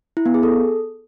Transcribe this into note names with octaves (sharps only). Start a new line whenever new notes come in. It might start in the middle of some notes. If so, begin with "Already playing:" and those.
E4
B3
G#4
A4